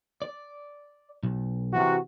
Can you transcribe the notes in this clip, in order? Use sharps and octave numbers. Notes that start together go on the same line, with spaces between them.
D5
B1
C3 E3 F#4